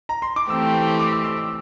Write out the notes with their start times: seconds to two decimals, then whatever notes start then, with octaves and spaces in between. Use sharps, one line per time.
0.09 A#5
0.22 C6
0.36 D6
0.49 E3 A3 C4 G4 E6
0.99 D6
1.12 E6
1.24 E6
1.36 E6